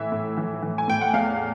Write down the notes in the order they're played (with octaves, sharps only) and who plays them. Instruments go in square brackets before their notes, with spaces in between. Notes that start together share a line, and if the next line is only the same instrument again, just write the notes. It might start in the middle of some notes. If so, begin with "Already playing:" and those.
Already playing: [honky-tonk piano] A2 E3 E5
A2
E3
E3
G#5
A2 G5
F#5
E2 F5